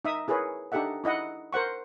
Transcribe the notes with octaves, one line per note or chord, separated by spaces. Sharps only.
D#4 E5 D#6
E4 G#4 A#4 B4 C#5
D4 D#4 G4 A4 E5 F#5
D#4 E4 D#5 F#5
A#4 C5 F#5 C#6